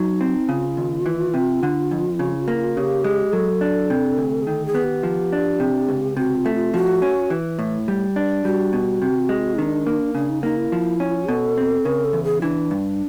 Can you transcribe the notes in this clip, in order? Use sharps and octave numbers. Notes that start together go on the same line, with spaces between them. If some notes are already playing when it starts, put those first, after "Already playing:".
Already playing: F#3 D#4
C4
C#3 F4
D#2
E3
C3
D3
F2
C#3
A#3
C#3 G4
G#3
F#3 A4
D4
C3
D2
G#4
D#3 A4
G#4
B3
G4
F3
D4
C3
C#2
C3 F#4
F4
A3
F4
F3 F#4
C#4
E3
A2
G3
D4
G3 F#4
B2
C3
G#3
D#3 D4
A#3
C#3 D4
D#4
A#3 D#4
E4
F3
C#4
B2 A4
C4
C#3 A#4
A4
E2
G#4
E3 D4
G2